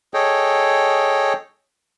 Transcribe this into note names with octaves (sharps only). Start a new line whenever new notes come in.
G#4 A4 C#5 D#5 G5